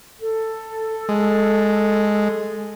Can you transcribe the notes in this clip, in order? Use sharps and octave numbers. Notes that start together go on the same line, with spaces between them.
A4
G#3